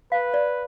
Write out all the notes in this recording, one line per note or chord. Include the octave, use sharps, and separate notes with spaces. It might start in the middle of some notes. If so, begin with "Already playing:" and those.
B4 F5
D5